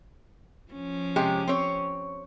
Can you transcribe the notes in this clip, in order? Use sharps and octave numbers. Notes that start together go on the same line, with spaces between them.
F3 C#4
C3 G#3 G4
C4 C#5